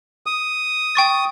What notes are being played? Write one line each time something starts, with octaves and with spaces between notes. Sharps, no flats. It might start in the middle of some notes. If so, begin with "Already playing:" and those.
D#6
G5 C#6 A6